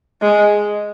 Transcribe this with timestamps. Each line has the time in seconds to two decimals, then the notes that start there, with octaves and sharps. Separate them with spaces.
0.22 G#3